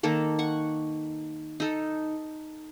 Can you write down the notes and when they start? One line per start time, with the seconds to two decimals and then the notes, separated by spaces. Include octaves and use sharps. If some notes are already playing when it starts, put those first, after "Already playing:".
0.03 D#3 A#3 A4
0.39 F#5 C#6
1.60 D#4 A4